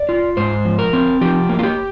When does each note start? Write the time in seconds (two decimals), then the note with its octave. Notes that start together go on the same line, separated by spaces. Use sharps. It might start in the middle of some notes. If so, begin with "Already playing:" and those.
Already playing: D5
0.09 F4
0.37 G#2 C5
0.65 F3
0.79 A#4
0.93 C4
1.21 F3 G4
1.49 A#3
1.59 F4
1.63 G4